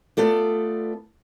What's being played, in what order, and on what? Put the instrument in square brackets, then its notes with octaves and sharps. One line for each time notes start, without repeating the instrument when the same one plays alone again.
[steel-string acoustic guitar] A3 B3 F4 A4 D5